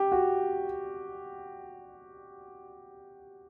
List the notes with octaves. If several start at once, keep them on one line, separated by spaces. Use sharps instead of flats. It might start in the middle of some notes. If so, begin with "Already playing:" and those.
Already playing: G4
F#4